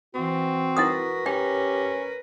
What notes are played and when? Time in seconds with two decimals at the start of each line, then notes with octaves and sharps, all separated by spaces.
0.15 E3 C4 F#4
0.77 E4 A#4 B4 F#5 D#6
1.26 C#4 G4 G5